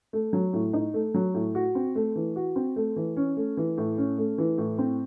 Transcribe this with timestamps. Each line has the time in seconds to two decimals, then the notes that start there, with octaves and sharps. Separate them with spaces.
0.13 A3
0.33 F#3
0.53 A2
0.73 D#4
0.94 A3
1.14 F#3
1.34 A2
1.55 F#4
1.75 C4
1.95 A3
2.16 E3
2.36 F#4
2.56 C4
2.76 A3
2.96 E3
3.16 C#4
3.37 A3
3.57 E3
3.78 A2
3.98 C#4
4.18 A3
4.38 E3
4.58 A2
4.78 C4